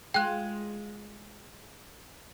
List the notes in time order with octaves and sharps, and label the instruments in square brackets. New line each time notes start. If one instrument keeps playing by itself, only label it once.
[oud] G#3 F4 [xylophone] G5 F#6